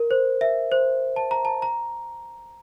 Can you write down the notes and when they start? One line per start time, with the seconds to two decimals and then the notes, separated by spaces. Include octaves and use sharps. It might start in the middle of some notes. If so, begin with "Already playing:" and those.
Already playing: A#4
0.11 C5
0.41 E5
0.72 C5
1.16 A5
1.31 A#5
1.45 A5
1.62 A#5